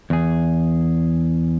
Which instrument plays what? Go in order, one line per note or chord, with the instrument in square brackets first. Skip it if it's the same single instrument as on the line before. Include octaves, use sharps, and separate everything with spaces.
[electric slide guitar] E2 G#4